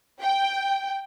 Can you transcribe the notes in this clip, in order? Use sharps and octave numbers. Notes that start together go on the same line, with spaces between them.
G5